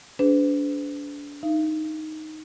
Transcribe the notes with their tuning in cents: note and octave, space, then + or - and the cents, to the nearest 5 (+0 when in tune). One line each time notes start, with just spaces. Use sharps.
D4 -30 G#4 +20 B4 +45
D#4 +0 F5 -45